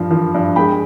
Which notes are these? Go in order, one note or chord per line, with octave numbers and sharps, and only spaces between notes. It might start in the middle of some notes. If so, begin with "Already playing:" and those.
Already playing: G2 F3
F3
G2
G#3 G5 B5